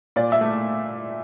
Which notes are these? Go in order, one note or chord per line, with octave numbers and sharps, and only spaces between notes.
A#2 D5
E5
A3